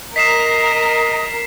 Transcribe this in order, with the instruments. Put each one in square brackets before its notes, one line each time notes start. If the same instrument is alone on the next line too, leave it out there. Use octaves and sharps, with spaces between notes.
[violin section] A#4 [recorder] D#5 [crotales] B6 C7 E7